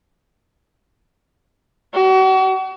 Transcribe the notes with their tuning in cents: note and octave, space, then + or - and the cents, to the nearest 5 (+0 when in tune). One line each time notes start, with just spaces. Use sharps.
F#4 +40